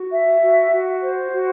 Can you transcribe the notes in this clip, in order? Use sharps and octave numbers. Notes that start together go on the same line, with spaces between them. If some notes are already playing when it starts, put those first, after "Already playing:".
Already playing: F#4
E5
F#4
F#4
C5
F#4